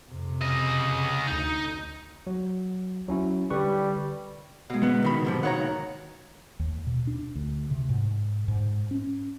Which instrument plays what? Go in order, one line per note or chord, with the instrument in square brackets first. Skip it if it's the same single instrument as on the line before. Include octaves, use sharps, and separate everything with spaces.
[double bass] F2 C3
[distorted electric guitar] C#3 D#5
[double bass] D2 [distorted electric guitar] D#4
[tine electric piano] F#3
F#3 C#4 E4
[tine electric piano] D3 B4 C#6 [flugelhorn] G3
[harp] B2 G#3
[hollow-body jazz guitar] B3
C2 D#3 B5
G#2 C3 F3
[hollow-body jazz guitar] D#2 D#3 A#5 [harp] C#5 F#5
[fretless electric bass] D#2
B2
D4
D2
C3
G#2
G#2
C#4